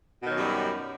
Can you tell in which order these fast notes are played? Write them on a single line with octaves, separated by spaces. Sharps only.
B2 D#3 F#3 F#2 G3